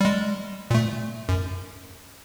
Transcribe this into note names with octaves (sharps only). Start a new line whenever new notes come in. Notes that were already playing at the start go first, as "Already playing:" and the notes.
G3 G#3
A#2 A3
F#2